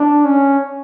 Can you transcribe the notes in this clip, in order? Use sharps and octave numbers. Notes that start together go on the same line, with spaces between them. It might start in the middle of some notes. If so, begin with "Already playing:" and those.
Already playing: D4
C#4